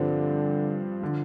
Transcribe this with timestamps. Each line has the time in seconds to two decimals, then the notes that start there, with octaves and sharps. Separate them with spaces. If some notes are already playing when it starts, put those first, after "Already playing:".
Already playing: G2 D3 F3 C4
1.02 D3 F3